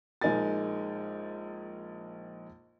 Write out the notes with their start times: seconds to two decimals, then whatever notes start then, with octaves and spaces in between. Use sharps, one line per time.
0.21 A#1 G#3 D#4 A#4 G#5 A6